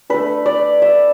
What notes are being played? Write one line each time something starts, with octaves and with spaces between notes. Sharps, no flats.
A3 D4 B4
D5
E5